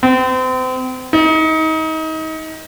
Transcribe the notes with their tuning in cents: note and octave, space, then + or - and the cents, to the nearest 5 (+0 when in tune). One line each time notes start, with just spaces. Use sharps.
C4 -35
D#4 +30